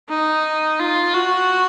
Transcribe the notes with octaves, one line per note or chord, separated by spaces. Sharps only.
D#4
F4
F#4